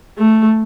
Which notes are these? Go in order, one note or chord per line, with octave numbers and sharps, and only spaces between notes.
A3